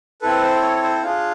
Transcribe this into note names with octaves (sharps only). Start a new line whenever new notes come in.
C4 E4 A4 B4
C5
C#5
C5
D4 F4 G#4 F5